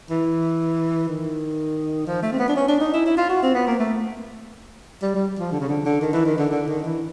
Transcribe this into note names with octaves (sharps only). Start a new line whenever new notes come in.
E3
D#3
F3
A3
C4
B3
D4
C#4
D4
D#4
E4
E4
F4
F#4
C4
B3
A#3
A3
G3
G3
F3
D3
C#3
D3
D3
D#3
E3
D#3
D3
D3
D#3
E3